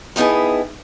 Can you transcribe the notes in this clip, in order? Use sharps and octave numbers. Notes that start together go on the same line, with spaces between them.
A2 B3 D#4 E4 G#4